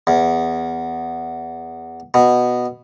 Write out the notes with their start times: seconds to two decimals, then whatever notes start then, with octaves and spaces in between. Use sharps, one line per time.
0.07 E2
2.14 B2